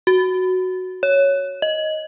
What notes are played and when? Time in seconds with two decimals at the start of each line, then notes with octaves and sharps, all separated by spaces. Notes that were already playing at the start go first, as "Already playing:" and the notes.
0.07 F#4
1.03 C#5
1.62 D#5